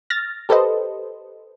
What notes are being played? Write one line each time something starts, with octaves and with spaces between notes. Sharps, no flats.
F6 A6 A#6
G4 A4 B4 C5 D#5